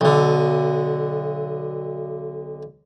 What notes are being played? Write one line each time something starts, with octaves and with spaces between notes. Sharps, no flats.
B1 D3